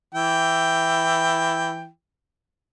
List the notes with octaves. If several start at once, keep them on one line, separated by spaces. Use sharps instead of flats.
E3 E4 G5